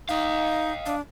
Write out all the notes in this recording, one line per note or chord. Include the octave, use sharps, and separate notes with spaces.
D#4 D#5 F5
D4